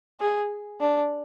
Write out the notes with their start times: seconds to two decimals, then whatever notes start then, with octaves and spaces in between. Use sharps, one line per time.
0.20 G#4
0.80 D4